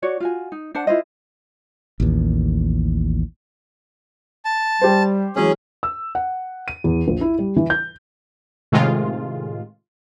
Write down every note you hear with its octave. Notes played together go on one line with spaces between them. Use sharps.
F#4 C#5 D5
F4 F#4 G#5
D#4
D4 C5 F#5 A5
E4 F4 C5 D#5
A1 D#2
A5
G3 G4 C5
E3 F#3 G#3 C#4 G#4
E6
F#5
D#7
E2
A#1
E4
G3
E3
G6
A2 C3 D#3 G#3 F4